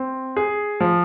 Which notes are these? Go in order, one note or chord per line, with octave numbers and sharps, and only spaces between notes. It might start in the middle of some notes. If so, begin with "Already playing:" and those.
Already playing: C4
G#4
F3